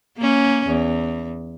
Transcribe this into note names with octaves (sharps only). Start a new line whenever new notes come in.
A#3 C#4
E2